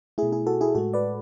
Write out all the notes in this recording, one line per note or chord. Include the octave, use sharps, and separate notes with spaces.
B2 A3 E4 G#4
E4 G#4
F#4 A4
E4 G#4
A2 G#3 F#4 A4
B4 D5